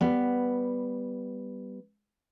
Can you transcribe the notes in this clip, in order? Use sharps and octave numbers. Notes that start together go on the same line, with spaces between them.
G3 B3